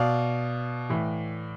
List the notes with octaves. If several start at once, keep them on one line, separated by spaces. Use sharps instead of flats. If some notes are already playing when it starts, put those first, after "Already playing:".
Already playing: B2 D5 F5
A2 E3